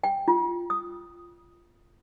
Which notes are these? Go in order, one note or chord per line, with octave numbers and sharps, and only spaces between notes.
G5
F4
D#6